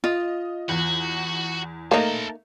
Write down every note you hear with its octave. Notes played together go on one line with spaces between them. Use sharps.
F4 D#5
E2 F#4
A3 A#3 D#4 A#4 A5